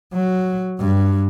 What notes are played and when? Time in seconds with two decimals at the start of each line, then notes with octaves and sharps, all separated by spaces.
0.14 F#3
0.79 G2